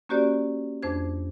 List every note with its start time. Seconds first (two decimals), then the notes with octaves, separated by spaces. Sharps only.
0.09 A#3 C#4 F#4 G4 C5 D5
0.83 F2 D4 C5 G#6